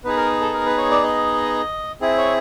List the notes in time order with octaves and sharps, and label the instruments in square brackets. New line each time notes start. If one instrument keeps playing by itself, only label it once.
[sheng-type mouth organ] B3 D#4 G#4 B4
A#4
A4
A#4
B4
C#5
D5
D#5
C4 E4 G#4
C#5